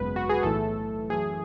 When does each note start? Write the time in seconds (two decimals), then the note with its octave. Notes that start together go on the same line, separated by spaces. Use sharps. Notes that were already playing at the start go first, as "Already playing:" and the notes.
Already playing: G#1 F#2 C#3 G#3 B3 B4
0.16 F#4
0.30 G#4
0.43 B1 A2 E3 A3 A4
1.10 F#2 E3 A3 G#4